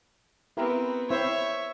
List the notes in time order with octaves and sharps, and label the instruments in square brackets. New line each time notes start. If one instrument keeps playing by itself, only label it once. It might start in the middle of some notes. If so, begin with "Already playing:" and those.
[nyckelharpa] B3 C4 [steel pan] E4 G4 A#4
[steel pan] C4 E4 C5 [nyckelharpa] C#5 E5